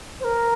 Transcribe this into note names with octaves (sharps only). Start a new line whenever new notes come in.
C5
A#4